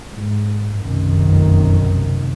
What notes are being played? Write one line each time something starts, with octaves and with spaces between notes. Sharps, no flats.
G#2
F1 B1 F#2 C3 D#3